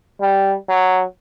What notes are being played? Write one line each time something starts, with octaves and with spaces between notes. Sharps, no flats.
G3
F#3